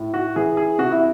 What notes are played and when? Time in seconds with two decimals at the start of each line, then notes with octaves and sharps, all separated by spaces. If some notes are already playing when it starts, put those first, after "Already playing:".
Already playing: A2
0.14 F#4
0.36 E3 G#4
0.57 G#4
0.78 C3 F#4
0.91 E4